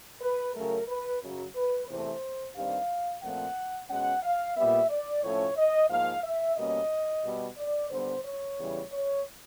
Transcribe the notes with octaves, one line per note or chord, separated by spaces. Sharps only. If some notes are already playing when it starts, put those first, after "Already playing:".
B4
C#3 F#3 A3 A#4
B4
F#2 C#3 F#3
B4
E2 C3 E3 A3 C5
G2 D#3 G3 C4 F5
A#2 F3 A3 C4 F#5
B2 G#3 C#4 F#5
F5
A#2 G3 B3 E5
D5
A2 F3 A3 C#4 C#5
D#5
G#2 F3 A#3 F5
E5
B2 G3 A#3 C#4 D#5
B2 G3 B3
D5
D3 G3 B3 C5
C#5
E2 C#3 E3 G3
C#5